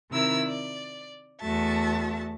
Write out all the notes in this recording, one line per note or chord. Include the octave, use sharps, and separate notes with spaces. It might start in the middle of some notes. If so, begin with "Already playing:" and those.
C3 D#3 E4 A#4 E6
D5
E2 A3 F#4 E5 A5